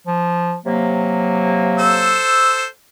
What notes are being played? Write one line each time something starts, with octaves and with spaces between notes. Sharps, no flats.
F3
C3 F#3 A#3
A4 C5 E6